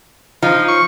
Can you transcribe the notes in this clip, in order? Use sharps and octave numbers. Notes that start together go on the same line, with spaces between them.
F3 D#4
C#6